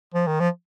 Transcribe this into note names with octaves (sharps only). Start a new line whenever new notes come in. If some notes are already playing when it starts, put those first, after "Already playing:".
F3
D#3
F3